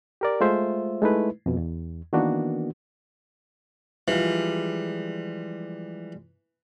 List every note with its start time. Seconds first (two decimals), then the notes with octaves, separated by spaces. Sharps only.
0.21 G4 A#4 D5
0.41 G#3 A3 F4 C5 E5
1.02 G#3 A3 D#4 E4 B4
1.46 F2 B2
1.57 E2
2.13 D#3 E3 A#3 B3 D4 F#4
4.08 E3 F3 G3 G#3